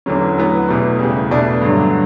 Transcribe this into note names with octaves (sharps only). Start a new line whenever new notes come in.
E2 D3 F#3 C#4
A2 F#3 B3
E2 B2 A3
E2 C#3 G3
B2 A3 D4
G2 D3 F#3